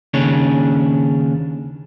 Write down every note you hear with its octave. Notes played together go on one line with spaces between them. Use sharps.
D#2 C#3 D4 C#5